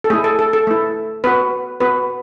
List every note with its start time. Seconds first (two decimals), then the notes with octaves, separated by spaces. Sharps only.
0.04 A4
0.10 A3 E4 G#4
0.24 A4
0.39 A4
0.53 A4
0.67 A3 E4
1.24 B3 F#4 B4
1.80 B3 F#4 B4